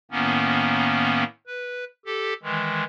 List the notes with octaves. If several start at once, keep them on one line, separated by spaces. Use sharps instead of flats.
A2 D#3 A#3 B3 C#4
B4
G4 A4
D#3 E3 G#3